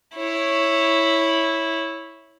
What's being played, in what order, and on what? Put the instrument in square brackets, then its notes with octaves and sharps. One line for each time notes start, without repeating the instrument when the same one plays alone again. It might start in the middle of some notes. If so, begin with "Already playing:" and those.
[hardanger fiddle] E4 C#5